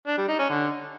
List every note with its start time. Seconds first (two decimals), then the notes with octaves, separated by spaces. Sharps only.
0.07 D4
0.17 G3
0.28 D#4
0.39 C#4
0.49 D3